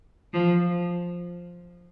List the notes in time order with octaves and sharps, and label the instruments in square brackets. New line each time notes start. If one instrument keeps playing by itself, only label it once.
[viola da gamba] F3